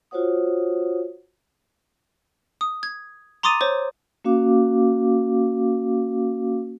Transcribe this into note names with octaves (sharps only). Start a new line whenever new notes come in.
F4 F#4 C5 C#5 F#5 D#6
D#6
G#6
A#5 C6 D6 D#6 A6 D#7
C5 C#5
A#3 C#4 F#4 F5 D6